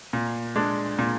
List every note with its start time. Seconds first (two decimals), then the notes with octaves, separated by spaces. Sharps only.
0.13 A#2
0.56 G#3 D4
0.99 A#2